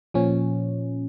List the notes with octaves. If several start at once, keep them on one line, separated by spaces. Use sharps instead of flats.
A#2 F3 C#4